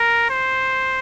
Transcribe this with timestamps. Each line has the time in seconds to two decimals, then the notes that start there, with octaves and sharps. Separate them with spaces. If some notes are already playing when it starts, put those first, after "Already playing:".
Already playing: A#4
0.30 C5